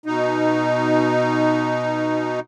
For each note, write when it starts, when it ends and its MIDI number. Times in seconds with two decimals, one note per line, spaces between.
0.06 2.40 47
0.06 2.40 63